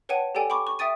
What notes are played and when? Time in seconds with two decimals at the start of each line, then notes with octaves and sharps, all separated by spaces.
0.09 B4 C#5 F#5 G5 A5 D#7
0.35 G4 A4 D5 G5 G#5
0.50 G5 B5 C#6 D6
0.67 C#6
0.79 E5 G5 D#6 A6 D#7